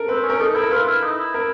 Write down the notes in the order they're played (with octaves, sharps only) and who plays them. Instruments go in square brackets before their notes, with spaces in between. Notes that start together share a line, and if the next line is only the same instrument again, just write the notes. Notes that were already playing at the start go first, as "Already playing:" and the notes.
Already playing: [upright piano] A4 A#4
[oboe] C4 [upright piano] B4
[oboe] C#4
[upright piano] A#4
[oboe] D#4 [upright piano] A4
[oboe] E4 [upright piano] A#4
[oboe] F4 [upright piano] B4
[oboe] E4
D#4
E4
[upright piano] A#4